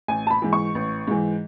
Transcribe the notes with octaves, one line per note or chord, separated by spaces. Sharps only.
A1 G#5
A5
B5
G#2 E3
C#6
A1
G#2 E3